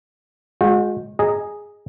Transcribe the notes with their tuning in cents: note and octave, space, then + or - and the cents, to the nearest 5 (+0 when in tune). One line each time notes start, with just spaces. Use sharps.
G#3 +5 F#4 -40 G5 +0
G#4 +0 D#5 -5 A#5 -10